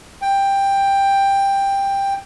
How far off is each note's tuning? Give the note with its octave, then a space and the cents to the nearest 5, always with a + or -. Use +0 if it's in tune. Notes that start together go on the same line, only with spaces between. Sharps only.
G5 +10